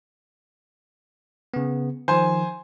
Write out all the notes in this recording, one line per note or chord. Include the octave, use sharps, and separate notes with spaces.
C#3 B3
D#3 F3 C5 G#5